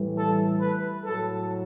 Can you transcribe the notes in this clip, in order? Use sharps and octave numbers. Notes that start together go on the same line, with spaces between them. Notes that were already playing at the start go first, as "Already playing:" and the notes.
Already playing: A2 E3 G3
A4
B4
A2 F#3 A4